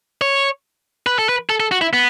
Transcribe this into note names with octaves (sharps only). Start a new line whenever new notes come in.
C#5
B4
A4
B4
A4
A4
F#4
E4
B3